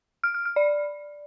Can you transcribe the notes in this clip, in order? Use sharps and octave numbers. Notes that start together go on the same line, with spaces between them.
F6
F6
F6
D5